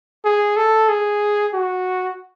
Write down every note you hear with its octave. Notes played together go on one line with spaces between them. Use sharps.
G#4
A4
G#4
F#4